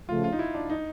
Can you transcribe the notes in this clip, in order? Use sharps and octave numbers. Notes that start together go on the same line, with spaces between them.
C#3 F3 A3 F4
F4
D#4
E4
D4
D#4